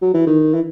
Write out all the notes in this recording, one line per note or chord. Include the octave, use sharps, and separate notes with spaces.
F#3
E3
D#3
E3